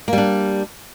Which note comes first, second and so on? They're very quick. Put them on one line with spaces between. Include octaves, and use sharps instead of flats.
A#3 G3 D4